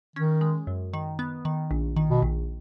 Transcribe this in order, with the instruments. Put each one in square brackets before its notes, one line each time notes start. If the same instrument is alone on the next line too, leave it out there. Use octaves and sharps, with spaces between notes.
[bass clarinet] D#3 [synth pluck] C#4
[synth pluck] G#3
F#2
D#3
B3
D#3
A#1
D#3
[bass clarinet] B2
[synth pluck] A#1